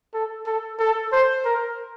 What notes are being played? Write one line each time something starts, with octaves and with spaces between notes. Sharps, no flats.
A4
A4
A4
C5
A#4